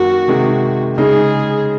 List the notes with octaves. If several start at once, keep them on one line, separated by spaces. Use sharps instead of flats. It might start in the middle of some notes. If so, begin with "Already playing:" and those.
Already playing: F#2 D#3 A#3 F#4
C3 D#3 G#3
C#3 G#3 D#4 G#4